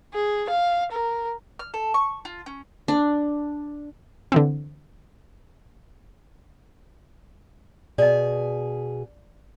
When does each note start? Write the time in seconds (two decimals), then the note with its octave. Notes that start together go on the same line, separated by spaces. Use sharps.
0.13 G#4
0.49 F5
0.92 A#4
1.59 F6
1.74 A4
1.94 C#6
2.25 F4
2.46 C#4
2.88 D4
4.32 D3 E3 C4
7.98 B2 G#4 D5 D#5